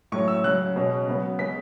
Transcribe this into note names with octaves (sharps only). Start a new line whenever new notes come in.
A2 F#3 C#4 C#6
E6
C#3 F#3 C#4 F#6
B2 G#3 C#4
C#3 F#3 B3
C#3 G#3 B3 B6